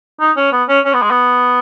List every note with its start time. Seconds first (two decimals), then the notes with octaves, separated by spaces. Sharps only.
0.20 D#4
0.37 C#4
0.53 B3
0.69 C#4
0.85 C#4
0.94 B3
1.02 G#3
1.11 B3